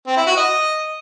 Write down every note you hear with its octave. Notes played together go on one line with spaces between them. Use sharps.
C4
E4
F#4
D#5